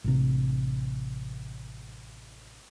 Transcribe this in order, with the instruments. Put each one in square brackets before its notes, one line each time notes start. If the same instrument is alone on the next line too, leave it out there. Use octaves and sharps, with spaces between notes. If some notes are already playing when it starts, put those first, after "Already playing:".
[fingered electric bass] A1 C3